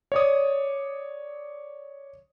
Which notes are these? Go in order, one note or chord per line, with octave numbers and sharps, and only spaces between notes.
C#5 D5 D#6